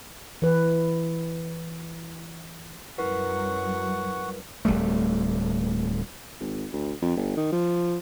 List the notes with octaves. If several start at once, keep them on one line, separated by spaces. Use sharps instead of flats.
E3 B4
F#2 F#3 G3 E4 A#4 B4 F#5 C#6
D1 B1 G3 A3
G#1
D2
F2
G1
D#3
F3